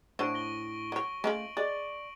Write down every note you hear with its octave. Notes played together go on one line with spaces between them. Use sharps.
A2 D4 E4 F#4 C5 C#6 D7
A#6 F#7 G7
F#3 C#5
G#3 A3 C#4 F4 D7 F#7
G#3 G#4 D5